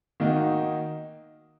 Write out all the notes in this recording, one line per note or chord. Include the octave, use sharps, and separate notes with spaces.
D#3 A#3 D#4 F#4